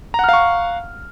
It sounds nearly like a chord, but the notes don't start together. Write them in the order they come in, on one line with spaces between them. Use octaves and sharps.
A#5 F#5 F6 F5 C#6